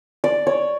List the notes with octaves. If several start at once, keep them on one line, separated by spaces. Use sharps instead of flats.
D5
C#5